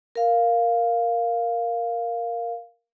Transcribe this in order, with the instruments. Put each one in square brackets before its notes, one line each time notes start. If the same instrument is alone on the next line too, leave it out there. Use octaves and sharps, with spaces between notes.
[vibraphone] A#4 F5